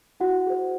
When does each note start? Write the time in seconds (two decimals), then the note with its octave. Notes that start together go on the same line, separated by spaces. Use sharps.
0.20 E4 F#4 F#5
0.47 G#4 C5